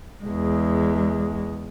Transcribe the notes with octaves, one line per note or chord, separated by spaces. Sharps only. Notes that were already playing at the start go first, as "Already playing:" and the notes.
E2 G#3